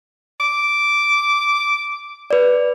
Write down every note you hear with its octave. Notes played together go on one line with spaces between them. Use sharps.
D6
B4 D5